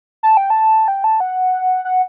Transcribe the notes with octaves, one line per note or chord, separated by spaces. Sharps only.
A5
G5
A5
G5
A5
F#5
F#5